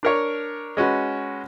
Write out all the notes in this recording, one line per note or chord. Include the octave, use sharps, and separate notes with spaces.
D4 A#4 C#5
G#3 C#4 F#4 B4